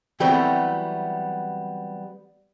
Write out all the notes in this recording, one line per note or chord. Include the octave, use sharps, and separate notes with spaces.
E3 F#3 G3 A3 B3 C4